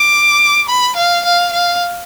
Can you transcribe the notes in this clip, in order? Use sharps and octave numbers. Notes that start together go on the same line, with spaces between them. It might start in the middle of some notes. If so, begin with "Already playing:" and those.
Already playing: D6
B5
F5
F5
F5